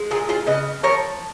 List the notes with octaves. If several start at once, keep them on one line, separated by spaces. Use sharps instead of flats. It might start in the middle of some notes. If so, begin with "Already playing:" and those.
Already playing: G#3
A#2 F4 G#4
F4 G#4
C#3 B4 D#5
F3 A#4 C#5